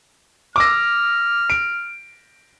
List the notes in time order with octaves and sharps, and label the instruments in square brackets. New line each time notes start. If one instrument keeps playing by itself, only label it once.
[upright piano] D6 E6 A#6 [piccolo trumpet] F6
[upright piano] D7